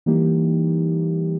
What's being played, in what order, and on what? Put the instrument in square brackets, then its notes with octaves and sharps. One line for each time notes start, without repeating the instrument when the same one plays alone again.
[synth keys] E3 G3 A#3 D#4 G4